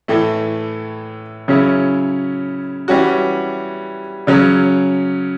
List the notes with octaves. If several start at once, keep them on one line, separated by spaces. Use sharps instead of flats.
A2 E3 A3
C#3 F#3 C#4 E4
E3 G3 C#4 F#4
C#3 F#3 C#4